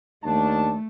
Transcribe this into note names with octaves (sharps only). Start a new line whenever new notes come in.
D#2 A3 D4 A5